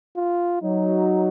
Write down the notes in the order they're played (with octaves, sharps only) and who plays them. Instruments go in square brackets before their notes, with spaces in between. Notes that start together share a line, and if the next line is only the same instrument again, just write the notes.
[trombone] F4
[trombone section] F#3 [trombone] D#4